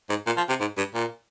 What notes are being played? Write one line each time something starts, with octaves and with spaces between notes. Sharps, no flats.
G#2
A#2
F3
C3
G#2
G2
A#2